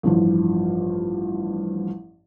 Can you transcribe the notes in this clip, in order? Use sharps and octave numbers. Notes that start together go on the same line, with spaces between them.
A1 G2 F3